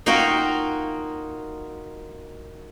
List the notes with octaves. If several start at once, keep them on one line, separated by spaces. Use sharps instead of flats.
A#3 D#4 F4 F#4 G5